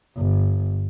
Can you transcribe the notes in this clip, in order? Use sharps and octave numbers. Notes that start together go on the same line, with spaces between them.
G1